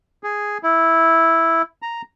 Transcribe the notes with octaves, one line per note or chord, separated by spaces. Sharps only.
G#4
E4
A#5